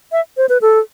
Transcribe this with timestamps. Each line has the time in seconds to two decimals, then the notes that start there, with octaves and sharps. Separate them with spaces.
0.12 E5
0.37 C5
0.49 B4
0.62 A4